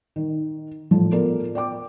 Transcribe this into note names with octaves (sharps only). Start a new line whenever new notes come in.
D#3
A2 F3
B3 F4 A4 A#4 D5
D5 G5 D6